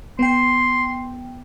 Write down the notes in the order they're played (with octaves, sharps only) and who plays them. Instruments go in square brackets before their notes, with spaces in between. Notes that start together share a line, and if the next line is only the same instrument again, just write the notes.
[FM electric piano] B3 G5 [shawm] C6